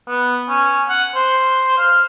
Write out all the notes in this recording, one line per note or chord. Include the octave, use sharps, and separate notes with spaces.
B3
C#4
F#5
C5
F5